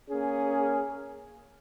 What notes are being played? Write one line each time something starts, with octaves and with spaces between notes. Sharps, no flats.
A#3 C#4 G#4